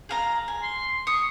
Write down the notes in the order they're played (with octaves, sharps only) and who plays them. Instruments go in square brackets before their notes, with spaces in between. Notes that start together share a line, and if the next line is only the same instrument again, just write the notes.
[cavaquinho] G#4 F5 A#5
G#5
[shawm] C6
[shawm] C#6 [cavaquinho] D#6